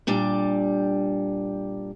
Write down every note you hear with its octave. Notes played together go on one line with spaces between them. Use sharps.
A#2 G3 D4 G5